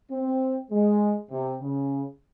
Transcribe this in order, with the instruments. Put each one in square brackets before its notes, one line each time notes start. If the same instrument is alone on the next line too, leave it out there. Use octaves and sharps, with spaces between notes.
[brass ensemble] C4
G#3
C3
C#3